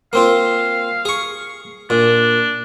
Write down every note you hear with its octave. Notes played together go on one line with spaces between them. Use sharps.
A#3 C4 F4 F5
G#4 C#6
A#2 D4